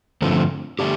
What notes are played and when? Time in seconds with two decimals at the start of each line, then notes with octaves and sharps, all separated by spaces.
0.22 G2 D3 F3 A3 C4
0.79 D3 A3 D4 G4